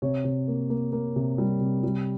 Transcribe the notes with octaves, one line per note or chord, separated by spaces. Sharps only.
C3 C#5
C3
A#3
A#3
A#3
C3
G3
C3
G3